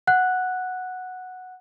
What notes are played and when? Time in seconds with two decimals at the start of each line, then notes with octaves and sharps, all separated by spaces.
0.07 F#5 F#6